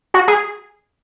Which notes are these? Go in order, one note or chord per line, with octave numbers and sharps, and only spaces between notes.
F#4
G#4